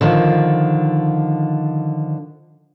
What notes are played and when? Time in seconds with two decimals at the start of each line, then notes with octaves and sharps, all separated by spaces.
0.01 D3 D#3 F3